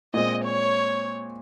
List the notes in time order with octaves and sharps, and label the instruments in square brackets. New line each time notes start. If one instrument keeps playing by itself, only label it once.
[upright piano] A#2 G#3 C4 [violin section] D#5
[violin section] C#5